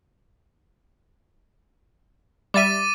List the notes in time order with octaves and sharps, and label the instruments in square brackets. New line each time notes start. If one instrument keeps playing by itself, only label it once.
[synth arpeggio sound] G3 E5 [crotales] D6 A6 D#7